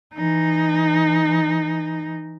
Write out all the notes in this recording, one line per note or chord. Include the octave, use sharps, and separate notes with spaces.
E3 D#4